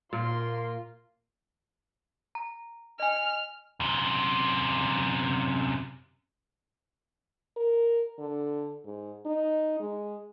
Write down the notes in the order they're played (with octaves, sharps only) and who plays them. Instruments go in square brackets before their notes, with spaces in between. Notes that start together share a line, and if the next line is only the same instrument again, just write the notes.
[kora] A#2 [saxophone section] A#3 F4 A#4 [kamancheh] C6
[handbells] A#5
[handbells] D#5 G#5 [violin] F6
[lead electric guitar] F#2 C3
[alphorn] A#4
D3
G#2
D#4
G#3